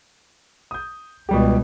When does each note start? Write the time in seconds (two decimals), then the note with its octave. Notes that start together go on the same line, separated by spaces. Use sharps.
0.71 D#6 G6
1.29 C#2 B2 G3 G4